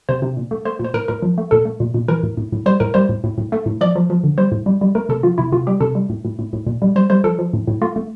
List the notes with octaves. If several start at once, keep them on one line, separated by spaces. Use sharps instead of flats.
C3 C5
C3
A#2
A3
A3 C5
A#2
C5
A2 A#4
A2 A#4
F3
A3
A#2 A4
A3
A#2
A#2
E3 A#4
A2
A2
A2
G3 C5
A2 A#4
G3 C5
A2
A2
A2
A3
A2
F3 D5
F3
F3
D3
G3 C5
A2
G3
G3
A3 A#4
C3 A4
F3 F4
C3 E4
C3 F4
G3 G4
C3 A4
G3
A2
A2
A2
A2
A#2
G3
G3 C5
G3 C5
F3 A4
F3
A2
A2
A3 F4
A3